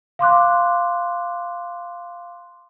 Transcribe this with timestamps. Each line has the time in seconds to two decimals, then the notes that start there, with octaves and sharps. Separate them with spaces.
0.19 F5 C6 D6 F#6